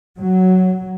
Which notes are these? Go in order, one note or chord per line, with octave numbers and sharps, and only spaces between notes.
F#3